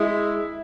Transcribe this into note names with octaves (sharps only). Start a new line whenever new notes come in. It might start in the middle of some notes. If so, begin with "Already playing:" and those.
Already playing: G#3 E4